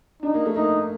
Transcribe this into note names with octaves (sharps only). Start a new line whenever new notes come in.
D4 D#4
A#3
A3
A#3 D#4